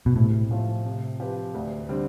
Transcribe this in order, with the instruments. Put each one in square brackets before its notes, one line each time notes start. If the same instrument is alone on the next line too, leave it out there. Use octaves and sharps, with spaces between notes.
[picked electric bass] B2
[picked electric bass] A2 [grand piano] C3
[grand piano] F3 A3 C4 F4
C3
F3 C4 G4 B4
D2
D3 G3 C4